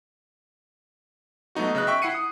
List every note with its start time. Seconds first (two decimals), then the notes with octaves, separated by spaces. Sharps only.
1.55 F#3 A3 B3 D#4 F#4
1.75 C#3 D#5 F#6
1.87 E5 G5 C#6
2.02 E4 F#5 C7 C#7 D#7
2.14 D#6